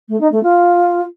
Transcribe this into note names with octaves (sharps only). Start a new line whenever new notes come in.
A3
D#4
A3
F4